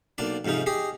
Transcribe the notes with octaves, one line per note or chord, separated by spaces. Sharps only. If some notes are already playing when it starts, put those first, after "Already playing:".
B1 A#3 D4 D5
F2 G#2 C3 C#4 D#4
G4 G#4 D#5